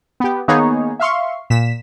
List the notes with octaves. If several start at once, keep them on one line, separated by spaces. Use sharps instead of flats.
B3 G4
D#3 A#3 B3 D#4 G#4 C#5
E5 F5 C6 C#6
A#2 B6 E7